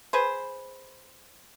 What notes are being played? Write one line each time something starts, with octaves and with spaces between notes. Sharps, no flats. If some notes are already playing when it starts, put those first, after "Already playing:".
G#4 B4 C5